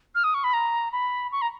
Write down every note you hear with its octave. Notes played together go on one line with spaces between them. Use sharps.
F6
D#6
C#6
B5
A#5
B5
C#6
A#5